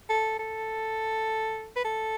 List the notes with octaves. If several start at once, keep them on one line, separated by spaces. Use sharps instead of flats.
A4
A4
B4
A4